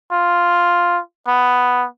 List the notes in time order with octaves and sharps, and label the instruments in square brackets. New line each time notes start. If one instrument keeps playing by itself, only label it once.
[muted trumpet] F4
B3